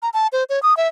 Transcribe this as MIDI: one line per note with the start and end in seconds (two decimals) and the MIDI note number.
0.02 0.09 82
0.14 0.27 81
0.32 0.44 72
0.50 0.61 73
0.63 0.77 87
0.77 0.88 76